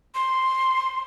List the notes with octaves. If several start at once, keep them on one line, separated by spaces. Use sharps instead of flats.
C6